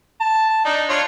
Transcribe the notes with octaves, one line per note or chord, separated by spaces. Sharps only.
A5
D4 D#4
D4 F4 C#5